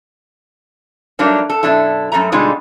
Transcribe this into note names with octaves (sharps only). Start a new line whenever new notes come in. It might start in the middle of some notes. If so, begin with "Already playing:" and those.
F#3 G3 A3 A#3 D4 D#4
A4
F#2 B2 D4 E4 A4
F#2 C3 G3 A3 A#5
B2 D3 G3 G#3 D#4 F4